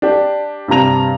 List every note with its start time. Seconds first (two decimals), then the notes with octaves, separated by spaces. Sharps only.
0.02 D4 G4
0.68 G2 C3 G3 A#5 F7